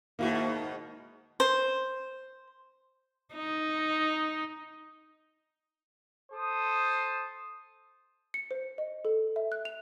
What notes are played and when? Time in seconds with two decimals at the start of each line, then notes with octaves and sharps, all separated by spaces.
0.19 G#2 B2 D#3 A#3 E4 F#4
1.40 C5
3.35 D#4
6.32 A4 C5 D#6
8.34 C#7
8.51 C5
8.78 D#5
9.05 A4
9.36 E5
9.52 F#6
9.65 F7